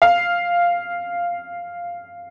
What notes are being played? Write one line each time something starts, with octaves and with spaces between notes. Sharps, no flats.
F5